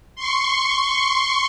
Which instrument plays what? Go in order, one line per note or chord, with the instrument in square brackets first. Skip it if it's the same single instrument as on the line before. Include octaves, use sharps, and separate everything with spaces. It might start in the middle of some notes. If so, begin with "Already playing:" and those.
[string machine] C6 C#6